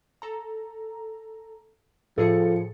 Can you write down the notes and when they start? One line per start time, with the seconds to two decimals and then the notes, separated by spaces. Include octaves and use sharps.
0.22 A4 A#5
2.18 A2 F3 G#4 A4 C#7